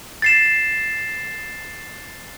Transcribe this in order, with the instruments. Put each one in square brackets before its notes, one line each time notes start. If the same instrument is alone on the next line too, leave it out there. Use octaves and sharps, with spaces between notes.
[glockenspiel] A6 C7 E7